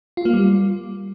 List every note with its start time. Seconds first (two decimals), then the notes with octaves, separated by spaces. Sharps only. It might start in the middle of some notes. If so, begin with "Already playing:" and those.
0.17 F4
0.25 A#3
0.33 G3